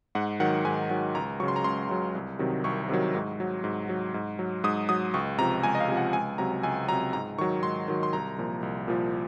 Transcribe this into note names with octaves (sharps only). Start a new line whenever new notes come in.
G#2 F#5
D#3 F#3 F#5
G#2 G#5
D#3 F#3
C#2 A#5
C#3 F#3 C#6
C6
A#5
C#2 C6
C#3 F#3
C2
C3 D#3 F#3
C2 C#6
C3 D#3 F#3
G#2
F#3
G#2
F#3
G#2
F#3
G#2 D#6
F#3 D#6
C#2 C#6
C3 F3 A#5
C#2 G#5
D#5
F5
C3 F3
F#5
C#2 G#5
C3 F#3 A#5
C#2 G#5
C3 F#3 A#5
G#2 A#5
D#3 F#3 C#6
G#2 C6
D#3 F#3
C6
C2 A#5
A#2 F3
C2
A#2 F3